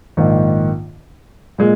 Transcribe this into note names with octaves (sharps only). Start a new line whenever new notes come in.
A#1 G#2 D#3
A#2 G#3